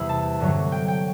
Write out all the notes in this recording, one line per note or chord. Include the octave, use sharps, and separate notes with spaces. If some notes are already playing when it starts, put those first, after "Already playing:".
Already playing: E2 C3 E3 G3 B5 E6
A5
G2 D3 F#3 A3
G5
G5